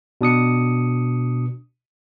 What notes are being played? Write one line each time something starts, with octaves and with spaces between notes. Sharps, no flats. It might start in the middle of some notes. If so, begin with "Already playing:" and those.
B2 D4 D#6 C#7